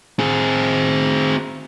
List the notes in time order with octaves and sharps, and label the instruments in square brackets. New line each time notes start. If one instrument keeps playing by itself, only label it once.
[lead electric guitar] C4 G#4